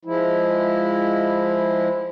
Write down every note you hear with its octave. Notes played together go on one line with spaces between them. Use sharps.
F3 G#3 E4